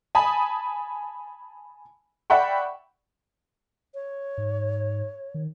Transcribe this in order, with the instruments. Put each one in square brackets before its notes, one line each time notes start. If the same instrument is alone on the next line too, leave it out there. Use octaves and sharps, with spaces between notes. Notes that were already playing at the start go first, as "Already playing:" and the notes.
[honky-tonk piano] G#5 A5 B5 D#6
D5 E5 F#5 G5 B5 C#6
[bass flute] C#5
[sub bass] G#2
D#3